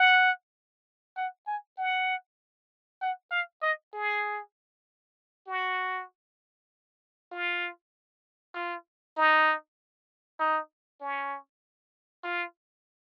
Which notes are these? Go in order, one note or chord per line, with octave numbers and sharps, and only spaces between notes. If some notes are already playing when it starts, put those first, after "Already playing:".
Already playing: F#5
F#5
G#5
F#5
F#5
F5
D#5
G#4
F#4
F4
F4
D#4
D#4
C#4
F4